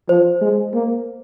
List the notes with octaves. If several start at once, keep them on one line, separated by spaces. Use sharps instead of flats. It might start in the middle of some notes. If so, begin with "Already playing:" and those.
F3 C5
G#3
A#3